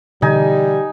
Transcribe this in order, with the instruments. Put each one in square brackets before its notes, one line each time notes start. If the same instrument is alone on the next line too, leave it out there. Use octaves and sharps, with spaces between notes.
[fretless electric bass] B2 D3 E3 [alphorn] G3 [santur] D#4 G#5